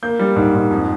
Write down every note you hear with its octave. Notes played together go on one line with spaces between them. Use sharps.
A#3 G6
G3
G#2
G#2
F2